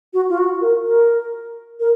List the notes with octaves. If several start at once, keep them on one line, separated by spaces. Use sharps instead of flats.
F#4
F4
F#4
A#4
A#4
A#4